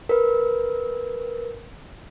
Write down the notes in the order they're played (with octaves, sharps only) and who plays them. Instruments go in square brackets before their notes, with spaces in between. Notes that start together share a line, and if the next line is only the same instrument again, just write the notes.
[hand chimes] A#4 B4